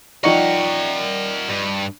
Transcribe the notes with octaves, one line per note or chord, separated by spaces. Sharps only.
F3 D#4 A#4 D5 F#5 G5 C#6
G2